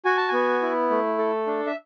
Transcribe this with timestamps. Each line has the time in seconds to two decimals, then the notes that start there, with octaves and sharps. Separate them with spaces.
0.05 F#4 G#5
0.17 A5
0.28 B3 G#5
0.62 E4
0.90 A3
1.18 A4
1.47 D4
1.67 E5